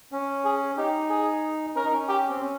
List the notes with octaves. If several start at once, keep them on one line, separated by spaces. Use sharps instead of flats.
C#4
G#4
D#4 G4
G#4
C#4 A#4
D#4
C#4
G4
C4
C#4